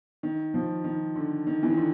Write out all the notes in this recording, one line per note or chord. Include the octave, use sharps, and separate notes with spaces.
D#3
F3
D#3
D3
D#3
E3
D#3
D3